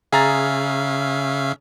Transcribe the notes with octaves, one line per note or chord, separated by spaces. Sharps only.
C#3 G#4 E5 F5 A#5 A6